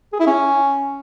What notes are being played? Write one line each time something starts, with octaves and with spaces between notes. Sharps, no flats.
G#4
E4
C#4